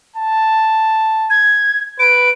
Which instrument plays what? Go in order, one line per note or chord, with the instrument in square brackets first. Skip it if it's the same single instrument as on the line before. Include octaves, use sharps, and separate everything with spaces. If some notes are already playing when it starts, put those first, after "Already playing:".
[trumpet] A5
[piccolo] G#6
[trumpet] B4 [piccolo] D7